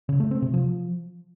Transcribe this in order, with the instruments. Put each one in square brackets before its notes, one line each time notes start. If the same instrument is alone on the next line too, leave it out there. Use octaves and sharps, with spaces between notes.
[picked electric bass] C#3
A3
C4
C3
F3